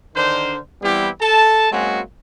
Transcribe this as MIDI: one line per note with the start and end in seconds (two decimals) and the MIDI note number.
0.15 0.58 50
0.15 0.58 51
0.15 0.58 62
0.15 0.58 70
0.15 0.58 72
0.82 1.09 52
0.82 1.09 55
0.82 1.09 59
0.82 1.09 60
0.82 1.09 64
0.82 1.09 67
1.21 1.68 69
1.21 1.68 81
1.71 2.01 54
1.71 2.01 56
1.71 2.01 58
1.71 2.01 60
1.71 2.01 61
1.71 2.01 66